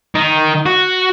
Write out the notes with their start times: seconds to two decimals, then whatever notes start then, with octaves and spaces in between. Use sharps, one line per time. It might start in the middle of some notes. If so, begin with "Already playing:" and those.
0.14 D#3 D#4
0.66 F#4